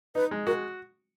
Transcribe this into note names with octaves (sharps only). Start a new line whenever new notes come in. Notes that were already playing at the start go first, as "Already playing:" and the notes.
D#4 B4
G#3
F#4 A#4